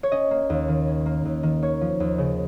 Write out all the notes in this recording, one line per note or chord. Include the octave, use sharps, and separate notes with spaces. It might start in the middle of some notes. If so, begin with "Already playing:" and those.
C#5
C#4 D#5
A#3
D#2
D#3
C#4
A#3
D#2
D#3
A#3 C#5
F3
D#2
C#3